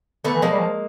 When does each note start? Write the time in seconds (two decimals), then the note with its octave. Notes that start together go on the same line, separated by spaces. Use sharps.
0.24 D3 A3 B3
0.34 E3
0.42 F3 G#3 A#3
0.51 G3
0.60 F3